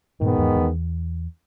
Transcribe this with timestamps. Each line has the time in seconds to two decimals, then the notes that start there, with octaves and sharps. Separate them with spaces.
0.21 G2 A#2 D#3 G#3 B3
0.38 E2 G#2
0.55 E2